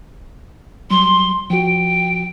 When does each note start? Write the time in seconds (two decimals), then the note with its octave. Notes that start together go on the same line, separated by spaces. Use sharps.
0.90 F#3 G3 C6
1.50 F3 F#4 G5